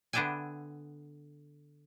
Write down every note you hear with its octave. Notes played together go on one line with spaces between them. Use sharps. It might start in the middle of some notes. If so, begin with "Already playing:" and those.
D3 B3 D4 E5 G5 G#5